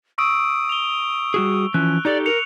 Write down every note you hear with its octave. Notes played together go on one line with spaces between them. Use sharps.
C#6 D#6 E6 D7
F7 G7
G3 F#4 G#4
E3 F3 C#4 F#6
D#4 G4 A4 D5
A#4 C#7 F7